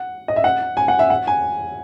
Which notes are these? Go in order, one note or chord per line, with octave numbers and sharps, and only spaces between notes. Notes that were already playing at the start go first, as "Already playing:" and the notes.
Already playing: F#5
D#5
E5
F#5
G#5
F#5
E5
F#5
G#5